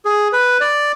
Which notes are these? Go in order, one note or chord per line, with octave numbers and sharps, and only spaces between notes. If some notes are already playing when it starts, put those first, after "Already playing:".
G#4
B4
D5